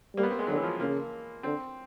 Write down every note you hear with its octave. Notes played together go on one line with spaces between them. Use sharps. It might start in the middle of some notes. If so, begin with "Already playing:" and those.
G3 A#3
B3
C4
G#3
D3 F#3
E3
F3
C#3 A#3
D3 C4